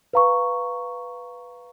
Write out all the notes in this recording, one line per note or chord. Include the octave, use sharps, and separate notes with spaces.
B4 F5 A#5 C#6